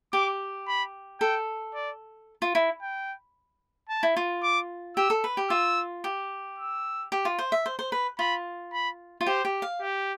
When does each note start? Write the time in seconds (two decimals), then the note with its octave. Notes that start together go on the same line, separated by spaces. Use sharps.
0.13 G4 D6
0.67 B5
1.20 A4 G5
1.74 D5
2.42 F4
2.55 E4
2.82 G5
3.89 A5
4.03 E4
4.17 F4
4.43 D6
4.97 G4 E6
5.10 A4
5.24 B4
5.37 G4
5.50 F4 E6
6.04 G4
6.59 E6
7.12 G4
7.25 F4
7.39 C5
7.52 E5
7.66 C5
7.79 C5
7.92 B4
8.19 F4 B5
8.73 B5
9.21 F4
9.26 G4 C5
9.45 G4
9.62 F5
9.81 G4